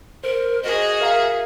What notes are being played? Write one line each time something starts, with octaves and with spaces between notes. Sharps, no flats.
A#4 C5
F#4 G#4 D#5
A#4 E5 F5 A#5